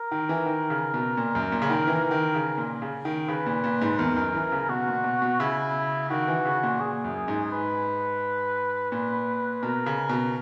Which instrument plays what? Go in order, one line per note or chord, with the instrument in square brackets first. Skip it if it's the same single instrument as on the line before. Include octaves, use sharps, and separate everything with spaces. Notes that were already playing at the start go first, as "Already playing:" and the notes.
Already playing: [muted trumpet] A#4
[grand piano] D#3
E3
D#3
C#3
B2
A#2
F#2
A#2
C#3
D#3
E3
D#3
C#3
A#2
C#3
D#3
[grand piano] C#3 [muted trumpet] B4
[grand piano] A#2
A#2
G#2
[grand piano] E2 [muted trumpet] A#4
[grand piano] F#2
E3
C#3
[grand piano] B2 [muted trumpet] F#4
[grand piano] A#2
B2
B2
[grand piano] C#3 [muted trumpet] E4
[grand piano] D#3 [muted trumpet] F#4
[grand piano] E3
C#3
A#2
[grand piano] A#2 [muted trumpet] G#4
[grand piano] F#2
G#2
[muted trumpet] B4
[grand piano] A#2
[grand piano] B2 [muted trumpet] A#4
[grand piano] C#3
B2